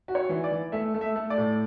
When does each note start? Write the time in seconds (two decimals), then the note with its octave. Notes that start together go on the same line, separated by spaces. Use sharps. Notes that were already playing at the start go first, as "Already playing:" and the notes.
0.08 F#4
0.15 C#5
0.29 E3
0.44 D5
0.51 E3
0.72 A3 E5
0.94 A3
1.01 E5
1.16 A3
1.30 D5
1.38 A2